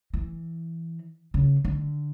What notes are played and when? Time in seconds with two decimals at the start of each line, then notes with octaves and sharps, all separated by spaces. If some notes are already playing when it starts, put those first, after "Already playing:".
0.14 E3
1.34 C#3
1.65 D3